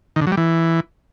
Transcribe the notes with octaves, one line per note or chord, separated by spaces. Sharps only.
D#3
D3
F#3
G3
E3